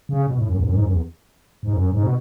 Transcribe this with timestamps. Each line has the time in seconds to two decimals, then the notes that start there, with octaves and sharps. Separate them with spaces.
0.09 C#3
0.27 B2
0.37 A2
0.46 F#2
0.55 E2
0.60 G#2
0.64 F#2
0.74 G#2
0.82 F#2
0.91 E2
1.63 G#2
1.73 F#2
1.92 G#2
2.03 B2